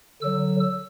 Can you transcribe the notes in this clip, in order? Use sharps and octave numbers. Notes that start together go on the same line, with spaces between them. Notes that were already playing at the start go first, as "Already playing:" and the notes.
D3 F#3 E6